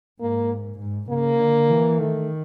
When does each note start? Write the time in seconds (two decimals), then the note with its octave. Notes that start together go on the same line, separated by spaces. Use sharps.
0.20 G#2 A#3
0.79 G#2
1.10 C#3 A#3
1.39 D3
1.70 E3
1.99 D#3 A3